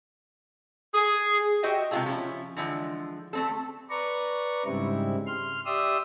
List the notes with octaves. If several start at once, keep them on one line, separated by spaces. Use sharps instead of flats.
G#4
F#4 G4 C5 D#5 E5 G5
C3 G#3 C4 F4 G#4 A4
F3 C#4 E4
D3 E3 F3 G#3
A3 C4 A4
B4 D5 A#5 C#6
G#2 C#3 G3 C4 E4
C6 F6
G4 D5 E5 C6 D#6 E6